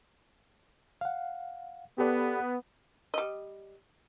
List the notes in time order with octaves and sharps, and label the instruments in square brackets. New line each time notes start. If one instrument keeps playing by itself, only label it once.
[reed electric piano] F5 F#5
[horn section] B3 [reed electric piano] G4 A4 D5
[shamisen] G3 D#5